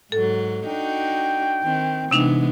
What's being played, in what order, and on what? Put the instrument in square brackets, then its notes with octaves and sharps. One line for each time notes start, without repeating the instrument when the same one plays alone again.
[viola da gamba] G#2 F#3 [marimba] A4
[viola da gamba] D4 D#4 F#4 [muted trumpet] G5
[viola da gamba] D#3 C4
[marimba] C3 D4 D#4 [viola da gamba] E3 G#3 B3